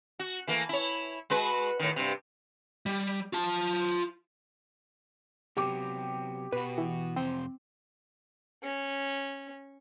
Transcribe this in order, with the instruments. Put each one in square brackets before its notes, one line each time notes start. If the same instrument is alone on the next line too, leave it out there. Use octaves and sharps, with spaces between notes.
[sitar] F#4
E3 A3 A#3
E4 C#5
G#3 F#4 B4
A2 D#3
G2 C3
[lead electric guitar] G3
F4 A5
[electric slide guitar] C3 F#3 B3 [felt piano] G4 G5 D6
[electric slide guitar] B2 F#4 [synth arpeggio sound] B4
[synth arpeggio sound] E3
[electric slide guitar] F2 C3 C5 [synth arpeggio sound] C4
[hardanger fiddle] C#4